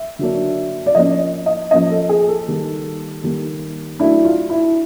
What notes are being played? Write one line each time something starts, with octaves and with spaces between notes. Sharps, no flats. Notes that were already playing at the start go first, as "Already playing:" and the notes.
Already playing: E5
D3 F#3 A#3 D4
D5
F3 A#3 C#4 D#5
D#5
F3 A#3 C#4 D#5
A4
G#4
A4
D#3 G3 A#3
D#3 G3 A#3
F#3 A3 D4 E4
F4
E4